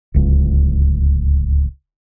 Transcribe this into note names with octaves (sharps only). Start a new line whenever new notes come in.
D1 C#2